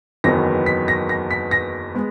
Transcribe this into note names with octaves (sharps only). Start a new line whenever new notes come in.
F#1 E2 D#3 F#3 B3 A#6
B6
A#6
A#6
B6
A#6
G#3 B3